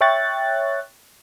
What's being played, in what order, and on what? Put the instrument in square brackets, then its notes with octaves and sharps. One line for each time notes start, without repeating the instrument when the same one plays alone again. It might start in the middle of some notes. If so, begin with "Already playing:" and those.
[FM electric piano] C#5 E5 G5 C#6 F#6 A6